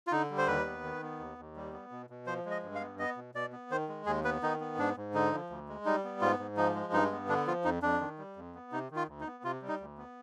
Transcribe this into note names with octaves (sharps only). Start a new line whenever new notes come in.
F4
D3 D#4
G3
C5
D#2 B4
B3
D#3
B3
D#2
D#2
G3
B3
B2
B2
F3 C5
G#3
D#5
G2
F5
B3
B3 D#5
B2
B2 D5
B3
D#3 C5
G#3
D#2 G#4
B3 B4
D#3 D#4
B3
G#2 D4
G#2
D3 D#4
F3
D2
G#3
G3 D#4
B3
G#2 F4
G#2
F3 D#4
G#3
G2 D#4
B3
D3 D4
F3 F4
F2 D#4
F2 D4
D#3
G3
F2
B3
C3 D#4
D#3
F4
D2
D#4
B3
C3 F4
G3
D#4
D2
B3